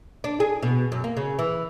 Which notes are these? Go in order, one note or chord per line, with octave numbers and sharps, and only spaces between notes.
D4
G#4
B2
F#2
A#3
C#3
E3